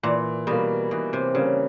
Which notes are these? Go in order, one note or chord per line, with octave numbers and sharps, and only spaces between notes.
A#2 E3
B2 G3 A#3
B2 E3
C3
C#3 G3 A#3